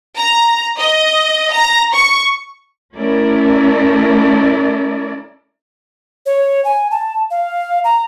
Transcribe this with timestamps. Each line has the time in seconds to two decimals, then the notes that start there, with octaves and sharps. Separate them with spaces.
0.16 A#5
0.79 D#5
1.53 A#5
1.93 C#6
2.96 A3 C#4 E4 A#4 D5
6.26 C#5
6.65 G#5
6.91 A5
7.31 F5
7.84 A#5